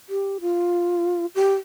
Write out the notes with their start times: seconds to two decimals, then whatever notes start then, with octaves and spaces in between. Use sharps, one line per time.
0.09 G4
0.41 F4
1.35 G4